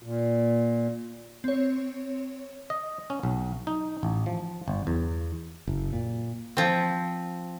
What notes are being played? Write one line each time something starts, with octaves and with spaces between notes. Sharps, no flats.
A#2
C4 C#5
D#5
C#4
B1
D#4
A1
F3
G1
E2
F#1
A#2
F3 C4